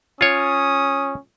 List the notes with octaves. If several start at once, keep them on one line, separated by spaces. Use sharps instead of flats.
C#4 F4 C#5 D#6